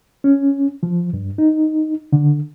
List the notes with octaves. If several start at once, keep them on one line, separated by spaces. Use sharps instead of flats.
C#4
F3
G2
D#4
D3